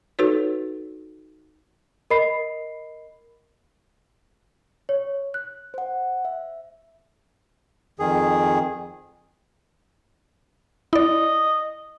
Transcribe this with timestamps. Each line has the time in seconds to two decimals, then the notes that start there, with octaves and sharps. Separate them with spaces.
0.19 D#4 F#4 A4 B4 C#5
2.10 A#4 D#5 B5 C7
4.89 C#5
5.34 F#6
5.74 C5 F#5
6.25 E5
7.99 F2 D#3 G#4
10.93 E4 D5 D#5